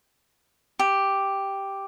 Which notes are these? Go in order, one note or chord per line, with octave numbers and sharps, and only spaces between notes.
G4